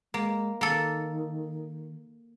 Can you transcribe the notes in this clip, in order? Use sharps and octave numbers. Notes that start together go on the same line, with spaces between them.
G#3 A#3
D#3 A#3 A4